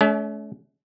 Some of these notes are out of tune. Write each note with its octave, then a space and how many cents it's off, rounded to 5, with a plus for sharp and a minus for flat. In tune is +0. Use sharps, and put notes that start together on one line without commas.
A3 -40 C#4 +35